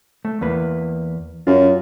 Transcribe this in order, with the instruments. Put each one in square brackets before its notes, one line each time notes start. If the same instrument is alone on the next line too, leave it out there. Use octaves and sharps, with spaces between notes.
[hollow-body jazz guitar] A3
E2 A#3 B4
[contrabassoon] F#2 [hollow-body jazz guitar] F4